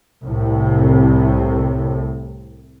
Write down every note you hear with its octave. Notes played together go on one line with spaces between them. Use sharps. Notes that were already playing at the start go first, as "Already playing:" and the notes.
C2 A2 C3